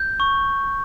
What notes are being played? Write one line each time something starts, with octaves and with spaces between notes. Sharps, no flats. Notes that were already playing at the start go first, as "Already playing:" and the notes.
Already playing: G6
C#6